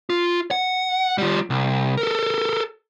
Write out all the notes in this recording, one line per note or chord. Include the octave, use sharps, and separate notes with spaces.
F4
F#5
G3 F4
C2
A4 A#4